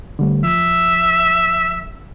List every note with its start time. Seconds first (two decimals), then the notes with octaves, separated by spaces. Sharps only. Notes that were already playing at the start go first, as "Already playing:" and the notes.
0.19 D3 G3 A3
0.44 F3 E5